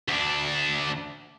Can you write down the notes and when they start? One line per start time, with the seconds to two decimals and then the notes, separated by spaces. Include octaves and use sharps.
0.08 D2 D4